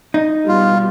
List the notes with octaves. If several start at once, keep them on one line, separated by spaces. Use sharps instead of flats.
D#4
B2 G3 F4